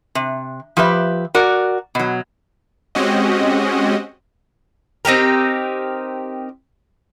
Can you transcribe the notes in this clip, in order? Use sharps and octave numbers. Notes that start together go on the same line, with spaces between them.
C3
F3 G4 B4 E5
F#4 A#4 D5
B2 F#3
G#3 C4 C#4 F#4 G4 D#5
C4 D#4 G4 A#4